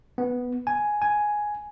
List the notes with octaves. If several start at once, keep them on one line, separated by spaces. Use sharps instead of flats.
B3
G#5
G#5